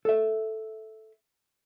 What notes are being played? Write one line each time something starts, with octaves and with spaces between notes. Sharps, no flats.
A4 E5